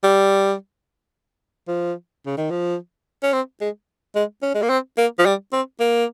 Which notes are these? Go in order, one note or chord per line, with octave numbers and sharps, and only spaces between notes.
G3
F3
C#3
D#3
F3
C#4
C4
G#3
G#3
C#4
G#3
A#3
C4
A#3
F3
G3
C4
A#3